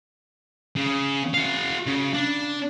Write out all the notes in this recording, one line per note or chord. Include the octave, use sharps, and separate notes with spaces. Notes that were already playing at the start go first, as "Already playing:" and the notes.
C#3
F#4 F5
C#3
D4